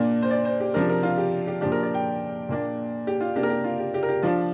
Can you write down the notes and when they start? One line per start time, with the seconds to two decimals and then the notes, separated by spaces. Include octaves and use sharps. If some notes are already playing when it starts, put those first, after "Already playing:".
Already playing: A#2 A#3 D4
0.22 C5
0.31 D5
0.45 C5
0.60 G4
0.74 C3 F3 D4 A#4
0.89 A#4
1.03 F4
1.18 G4
1.47 G4
1.61 A#2 F3 D4 G4
1.72 A#4
1.83 D5
1.94 G5
2.49 A#2 A#3 D4
3.07 G4
3.21 F4
3.36 C3 A#3 D4 G4
3.43 A#4
3.49 G4
3.64 F4
3.79 G4
3.94 G4
4.03 A#4
4.09 G4
4.23 F3 D4 F4